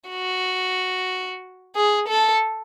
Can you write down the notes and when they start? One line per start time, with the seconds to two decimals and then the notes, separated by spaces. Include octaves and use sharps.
0.10 F#4
1.76 G#4
2.09 A4